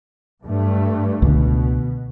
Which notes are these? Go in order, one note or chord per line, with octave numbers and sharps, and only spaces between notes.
G2 A3
C#2 B2 D3